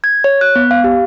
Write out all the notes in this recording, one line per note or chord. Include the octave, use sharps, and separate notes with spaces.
G#6
C#5
F#6
B3
F5
G4